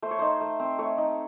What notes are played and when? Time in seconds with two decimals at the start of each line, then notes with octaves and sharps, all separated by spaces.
0.02 A3 C5
0.11 C#5
0.19 D#4 C5
0.41 A3
0.60 C4
0.79 A3 C#5
0.98 D#4